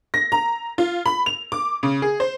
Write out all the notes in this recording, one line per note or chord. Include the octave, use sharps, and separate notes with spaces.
A#6
A#5
F4
B5
F7
D6
C#3
G#4
C5